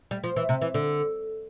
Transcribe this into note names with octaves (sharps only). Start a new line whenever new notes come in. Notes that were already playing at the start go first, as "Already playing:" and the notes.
G3
F3
E3
C3
E3
D3